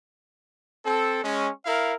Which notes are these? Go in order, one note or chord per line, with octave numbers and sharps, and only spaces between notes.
C4 A4
G#3 C#4
E4 A#4 F5